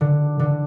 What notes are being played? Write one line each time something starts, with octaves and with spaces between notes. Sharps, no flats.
D3
D3